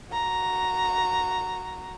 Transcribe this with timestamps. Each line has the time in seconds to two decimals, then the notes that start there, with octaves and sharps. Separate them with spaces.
0.12 F#4 A#5